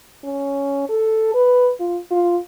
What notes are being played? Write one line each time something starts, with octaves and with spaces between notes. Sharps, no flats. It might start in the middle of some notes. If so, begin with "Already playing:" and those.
C#4
A4
B4
F4
F4